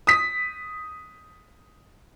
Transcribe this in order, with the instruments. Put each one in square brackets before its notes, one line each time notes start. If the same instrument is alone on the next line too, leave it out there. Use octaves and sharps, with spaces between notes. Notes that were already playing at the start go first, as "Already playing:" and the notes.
[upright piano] D#6 B6